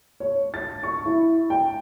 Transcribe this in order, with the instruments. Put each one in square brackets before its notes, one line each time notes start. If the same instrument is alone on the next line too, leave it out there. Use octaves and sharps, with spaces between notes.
[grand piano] C#5
A6
C#6
E4
G5